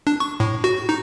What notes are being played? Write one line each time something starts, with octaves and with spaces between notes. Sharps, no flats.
D4
C#6
A2
F#4
D#4